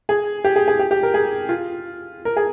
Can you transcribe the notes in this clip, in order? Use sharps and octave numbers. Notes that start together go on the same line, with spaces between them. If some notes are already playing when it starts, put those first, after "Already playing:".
G#4
G4
G#4
G#4
G4
G4
A#4
G#4
F4
A#4
G#4